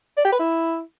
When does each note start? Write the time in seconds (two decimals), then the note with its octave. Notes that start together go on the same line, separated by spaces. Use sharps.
0.17 D5
0.25 G4
0.32 B4
0.40 E4